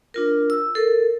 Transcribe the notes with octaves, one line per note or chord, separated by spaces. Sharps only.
D4 F4 A#4
E6
A4 A#4